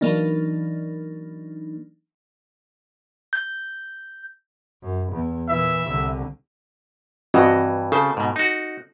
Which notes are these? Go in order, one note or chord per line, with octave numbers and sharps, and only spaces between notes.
E3 F#3 A#3 D4 D#4
G6
F#2
E2
A#2 E3 E5
C2 D3
G2 E3 C4 F#4 D#5
C#3 A4 C5
G#2 B2
D#4 F#4